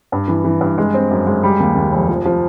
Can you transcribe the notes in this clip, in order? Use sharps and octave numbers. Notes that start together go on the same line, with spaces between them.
G2
E3
E3
G2
G#3
C4
F#2
G#3
G3
D#2
D#2
F1
F3
F3